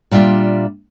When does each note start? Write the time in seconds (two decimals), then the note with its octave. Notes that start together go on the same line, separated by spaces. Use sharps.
0.11 A#2 G3 D4 F4 E5